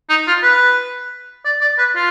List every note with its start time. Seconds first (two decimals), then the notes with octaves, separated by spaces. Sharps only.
0.10 D#4
0.27 F4
0.43 B4
1.45 D5
1.61 D5
1.78 B4
1.95 F4